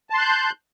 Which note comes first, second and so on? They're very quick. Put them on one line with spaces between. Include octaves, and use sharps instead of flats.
A5 C6 F#6 G6